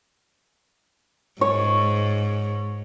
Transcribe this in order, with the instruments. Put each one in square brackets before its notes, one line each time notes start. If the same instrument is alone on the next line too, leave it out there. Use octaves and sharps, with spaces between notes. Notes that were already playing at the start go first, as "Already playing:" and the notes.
[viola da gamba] G#2 [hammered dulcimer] C#5